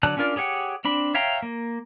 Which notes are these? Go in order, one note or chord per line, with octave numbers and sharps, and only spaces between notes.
D3 F#3 D5 A5 F#6
C#4 D4 F4 A#4 D5
G4 G#4 C#5 F#5 G5
C4 D4 B5
C#5 E5 F5 G5 A#5
A#3